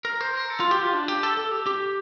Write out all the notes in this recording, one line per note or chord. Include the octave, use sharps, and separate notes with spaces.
A#4
C5
A#4
A4
F4
G4
F4
D4
G4
A4
A4
G4
G4